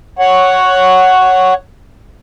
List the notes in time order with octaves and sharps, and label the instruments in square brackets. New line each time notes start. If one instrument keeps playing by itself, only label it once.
[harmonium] C#5 F#5